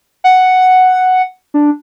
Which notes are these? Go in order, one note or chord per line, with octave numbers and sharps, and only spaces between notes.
F#5
D4